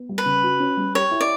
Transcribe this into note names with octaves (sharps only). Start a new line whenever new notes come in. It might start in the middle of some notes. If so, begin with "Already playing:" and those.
Already playing: B3
G3
B4
C#3
F#4
C#4
G3
G4 C#5
E4
D5